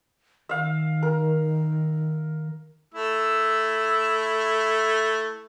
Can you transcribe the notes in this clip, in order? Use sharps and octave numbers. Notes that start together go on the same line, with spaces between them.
D#3 E5 F5
A#4
A3 E4 E6